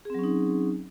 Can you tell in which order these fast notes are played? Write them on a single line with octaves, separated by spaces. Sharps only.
G#4 C4 F#3 C#4 D#4